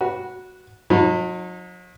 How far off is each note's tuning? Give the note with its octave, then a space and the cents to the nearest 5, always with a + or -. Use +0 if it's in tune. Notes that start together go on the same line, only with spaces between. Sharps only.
F#4 +0 B4 -15
F#3 -45 D#4 +0 B5 -15